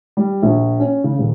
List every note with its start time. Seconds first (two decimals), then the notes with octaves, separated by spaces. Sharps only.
0.17 G3
0.43 A#1
0.80 C#4
1.04 C#3
1.18 D#1